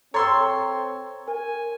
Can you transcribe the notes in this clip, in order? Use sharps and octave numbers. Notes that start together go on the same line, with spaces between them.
C4 A4 C#5 A#5 C6 E6 A6
A#4 G#5